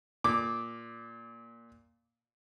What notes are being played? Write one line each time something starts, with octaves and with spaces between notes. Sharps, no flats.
A#2 D6